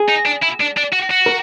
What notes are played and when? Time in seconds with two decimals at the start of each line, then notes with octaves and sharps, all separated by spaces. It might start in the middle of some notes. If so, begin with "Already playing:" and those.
Already playing: G#4
0.09 D#4
0.26 D4
0.42 E4
0.60 D4
0.77 D4
0.92 F#4
1.10 F#4
1.26 A#4